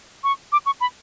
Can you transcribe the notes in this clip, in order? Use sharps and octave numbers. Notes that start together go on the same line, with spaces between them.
C#6
D6
C#6
B5